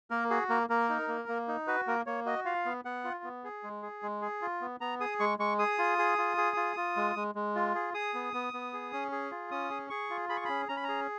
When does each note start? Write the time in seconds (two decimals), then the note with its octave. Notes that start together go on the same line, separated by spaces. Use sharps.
0.10 A#3 A#4
0.30 F#4 G#4
0.49 A#3 A#4
0.70 A#3 A#4
0.89 D#4
1.08 A#3
1.28 A#3
1.48 D#4
1.67 F#4 B4
1.87 A#3 A#4
2.06 A#3 C#5
2.26 F#4 D#5
2.45 F4 F5
2.65 B3
2.85 B3 F#5
3.04 F4
3.24 B3
3.44 G#4
3.63 G#3
3.83 G#4
4.03 G#3
4.22 G#4
4.42 F4
4.61 B3
4.80 B3 A#5
5.00 G#4 D#6
5.20 G#3 C#6
5.39 G#3 C#6
5.59 G#4 D#6
5.78 F4
5.98 G#4
6.18 F4
6.37 G#4
6.57 F4
6.77 F4
6.96 G#3
7.16 G#3
7.35 G#3
7.55 F4
7.75 G#4
7.94 G#4 D#6
8.14 B3
8.34 B3
8.53 B3
8.73 G#4
8.93 C#4
9.12 G#4
9.31 F4
9.51 C#4 D#6
9.70 G#4
9.90 G#4 C#6
10.10 F4
10.29 G#4 B5
10.37 C#6
10.45 C#4 B5
10.68 C#4 A#5
10.77 B5
10.84 G#4 A#5